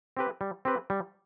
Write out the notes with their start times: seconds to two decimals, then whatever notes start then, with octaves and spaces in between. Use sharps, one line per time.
0.17 C4 G4 B4
0.41 G3
0.65 C4 G4 B4
0.90 G3